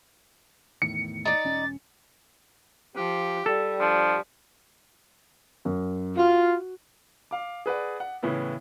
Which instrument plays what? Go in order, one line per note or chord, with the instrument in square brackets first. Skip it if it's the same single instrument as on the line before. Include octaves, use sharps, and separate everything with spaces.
[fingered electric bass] E2 A2 D#3 [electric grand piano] C#7
[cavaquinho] D#4 D5 [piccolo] A6
[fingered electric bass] E1 C#4
[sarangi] F3 [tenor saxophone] G4
[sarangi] G3 [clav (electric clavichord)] A4
[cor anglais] F3 [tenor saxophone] D4
[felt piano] F#2
[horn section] F4 [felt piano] F#4
[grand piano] F5 D6
G#4 B4 D5 F#5
F#5
A2 C#3 E3 B3 E4